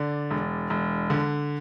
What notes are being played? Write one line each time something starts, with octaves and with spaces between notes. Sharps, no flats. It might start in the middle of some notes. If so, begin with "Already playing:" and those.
Already playing: D3 D5
E1
E1
D3